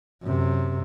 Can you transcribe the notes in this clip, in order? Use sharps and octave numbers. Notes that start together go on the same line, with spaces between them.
F#2 C3